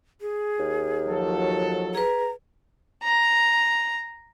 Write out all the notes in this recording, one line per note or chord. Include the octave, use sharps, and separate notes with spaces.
G#4
D#2
F3 F#3 A4
G#4 B4 A#5
A#5